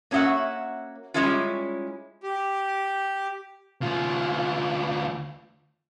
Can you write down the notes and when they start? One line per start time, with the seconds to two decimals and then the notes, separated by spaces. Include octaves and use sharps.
0.11 A#3 C#4 F#4 D#5 E5 F#5
1.14 G3 G#3 C#4 E4 F4
2.23 G4
3.81 D2 F4